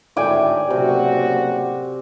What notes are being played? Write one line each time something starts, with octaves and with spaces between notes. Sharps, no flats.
G#1 D2 A2 D5 G5 G#5
F#1 A2 C3 F#4